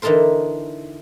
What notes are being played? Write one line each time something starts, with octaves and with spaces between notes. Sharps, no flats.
D3 E3 D#4 A4 A#4 C5